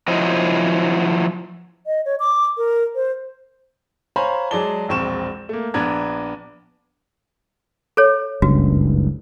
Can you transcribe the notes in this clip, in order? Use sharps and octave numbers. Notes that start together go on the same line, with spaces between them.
F3 F#3 E4 C5 D#5
D#5
C#5
D6
A#4
C5
C5 C#5 F5 G#5 A#5 B5
F#3 G#3 G#4 D5 A5 G7
E1 A#1 C4 C#6 E7
A3 A#3
A#1 B3 D4 A#5 G#6
A4 C#5
F#1 C#2 G2 F#4